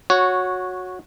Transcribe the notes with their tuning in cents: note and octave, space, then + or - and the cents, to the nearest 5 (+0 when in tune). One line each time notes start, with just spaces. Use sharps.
F#4 -15 C#5 +0